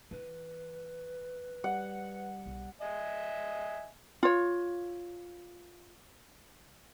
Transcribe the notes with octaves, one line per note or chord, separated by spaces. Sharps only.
E3 B4
G3 F#5
B1
D#5 E5 G#5
F4 C#5